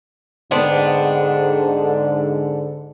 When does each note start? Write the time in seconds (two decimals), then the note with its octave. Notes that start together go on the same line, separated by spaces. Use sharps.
0.51 G#2 D3 B3 C4 D4